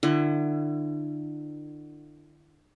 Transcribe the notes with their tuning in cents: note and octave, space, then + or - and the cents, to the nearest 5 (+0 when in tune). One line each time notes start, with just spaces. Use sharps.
D3 +35 E4 +35